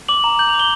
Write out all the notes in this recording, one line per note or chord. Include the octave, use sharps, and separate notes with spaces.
D6 F#7
A#5
G6 F#7
F7
D6
G7